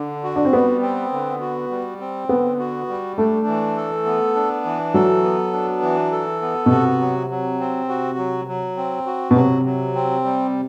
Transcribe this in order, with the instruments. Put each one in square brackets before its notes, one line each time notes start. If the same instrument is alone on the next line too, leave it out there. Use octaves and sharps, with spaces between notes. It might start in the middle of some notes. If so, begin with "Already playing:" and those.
Already playing: [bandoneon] D3 [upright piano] D4
[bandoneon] F#4
[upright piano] D4
C4
[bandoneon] G3 [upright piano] B3
[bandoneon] C4
D3
F#4
G3
C4
[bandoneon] D3 [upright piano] B3
[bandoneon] F#4
G3
[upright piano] A3 [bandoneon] D4
[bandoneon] E3
A4
B3
D4
E3
[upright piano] F#3 [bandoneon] A4
[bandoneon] B3
D4
E3
A4
B3
[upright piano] B2
[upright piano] C3 [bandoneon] F#4
[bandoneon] F#3
F#3
C4
F#4
F#3
F#3
C4
F#4
[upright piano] B2
[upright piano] C3 [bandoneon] F#3
[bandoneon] F#3
C4
G3